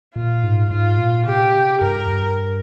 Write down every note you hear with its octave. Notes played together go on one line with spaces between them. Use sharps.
A#2 F4
G#2
G#2 F4
A#2
C3 G4
G2 A#4
G2